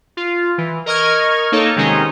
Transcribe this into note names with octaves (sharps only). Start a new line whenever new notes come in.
F4
E3
A#4 D#5 C#6 F6 G#6
A#3 D#4 A4 C#5
C3 D#3 G#3 C#4 D#4